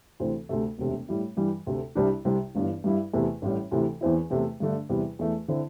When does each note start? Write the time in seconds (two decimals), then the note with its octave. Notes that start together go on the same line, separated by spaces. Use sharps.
0.20 D2 C3 E3 C4
0.49 D2 C3 A3
0.78 E1 D2 C3 A3
1.09 A2 G3 E4
1.37 G2 E3 G3
1.67 D2 C3 A3
1.95 C2 C3 G3 D4
2.25 C2 C3 G3 E4
2.55 G1 G2 E3
2.84 G2 G3 E4
3.13 E2 C3 A3 E4
3.42 A1 A2 G3
3.72 D2 C3 E3
4.01 E2 E3 C4 E4
4.30 E2 C3 A3
4.60 G2 D3 A3 D4
4.89 E2 C3 G3 E4
5.19 E2 E3 A3
5.48 D3 C4 E4